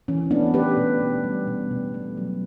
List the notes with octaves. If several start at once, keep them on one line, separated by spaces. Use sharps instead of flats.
E3 C#4
A3 B3 D4
A3 G4 B4
B2
B3
G3
B2
B2
A3
F#3